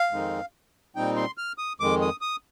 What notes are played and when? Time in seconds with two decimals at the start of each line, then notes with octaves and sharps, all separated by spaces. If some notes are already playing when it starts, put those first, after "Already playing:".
Already playing: F5
0.11 F2 D#3 G#3 C4 D#4
0.96 A#2 G3 C4 D#4 G5
1.16 C6
1.38 F6
1.58 D#6
1.80 F2 D#3 G#3 D6
2.01 D#6
2.21 D#6